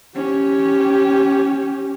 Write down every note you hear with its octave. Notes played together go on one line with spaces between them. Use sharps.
C#4 G4